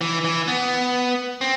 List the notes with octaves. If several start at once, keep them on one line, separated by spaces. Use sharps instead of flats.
E3
E3
B3
C4